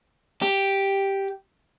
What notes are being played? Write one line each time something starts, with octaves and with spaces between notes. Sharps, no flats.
G4